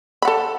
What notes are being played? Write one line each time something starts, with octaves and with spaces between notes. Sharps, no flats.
A4 F#5 B5